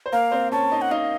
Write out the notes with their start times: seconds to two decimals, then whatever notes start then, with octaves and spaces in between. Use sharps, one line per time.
0.06 C5
0.12 A#3 A#4 F5
0.32 C4 C5
0.52 C#4 C#5 A5
0.72 D#4 D#5
0.82 F#5
0.91 D#4 D#5 F5